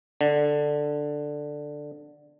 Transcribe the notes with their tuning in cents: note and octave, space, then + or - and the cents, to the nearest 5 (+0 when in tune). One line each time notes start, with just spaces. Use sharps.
D3 +5